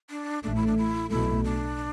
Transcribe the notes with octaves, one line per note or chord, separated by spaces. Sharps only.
D4
A1 A2 A3 D4
E4
D4
E4
B1 B2 A3 E4
D4